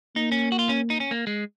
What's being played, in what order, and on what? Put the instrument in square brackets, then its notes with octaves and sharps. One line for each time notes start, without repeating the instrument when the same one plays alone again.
[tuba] A#3 [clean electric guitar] D#4
[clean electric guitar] C#4
F#4
F4
C#4
D#4
C#4
A#3
G#3